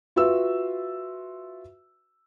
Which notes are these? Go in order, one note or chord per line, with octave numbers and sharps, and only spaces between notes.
F4 F#4 B4 E5 E6